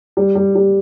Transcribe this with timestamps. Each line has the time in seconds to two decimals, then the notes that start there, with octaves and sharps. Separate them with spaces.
0.17 G3
0.35 G3
0.55 G3